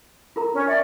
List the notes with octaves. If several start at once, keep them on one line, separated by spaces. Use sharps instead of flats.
F4 A#4 A#5
C#4
D5 E5 G5